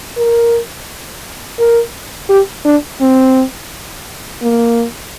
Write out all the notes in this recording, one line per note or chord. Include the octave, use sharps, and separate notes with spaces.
A#4
A#4
G4
D4
C4
A#3